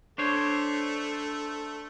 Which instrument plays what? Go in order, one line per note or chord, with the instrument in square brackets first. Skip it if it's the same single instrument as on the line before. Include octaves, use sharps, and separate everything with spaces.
[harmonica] A3 [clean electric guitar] D4 C5 C#5